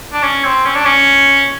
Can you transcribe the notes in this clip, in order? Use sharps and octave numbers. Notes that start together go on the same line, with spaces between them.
D4
C#4
C4
C#4
D4
C#4